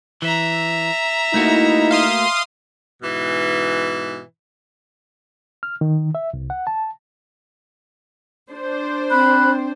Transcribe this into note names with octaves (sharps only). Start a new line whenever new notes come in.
E3 E5 A#5
A3 A#3 D#4 E4 F#4
F5 C6 D#6
G#2 B2 E3
F6
D#3
E5
C2
F#5
A5
D4 C5
C4 B5 F#6